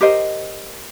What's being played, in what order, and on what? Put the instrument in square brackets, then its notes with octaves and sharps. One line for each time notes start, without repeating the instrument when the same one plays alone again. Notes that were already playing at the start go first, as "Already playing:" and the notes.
[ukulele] G4 A#4 C5 D#5